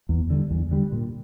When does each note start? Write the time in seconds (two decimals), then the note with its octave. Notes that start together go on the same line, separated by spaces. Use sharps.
0.09 E2
0.30 D3 G3
0.50 E2
0.71 D3 G3
0.92 A#2